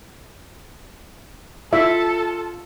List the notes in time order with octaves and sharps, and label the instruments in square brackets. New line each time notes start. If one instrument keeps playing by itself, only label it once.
[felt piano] F4 [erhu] A4 [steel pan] E5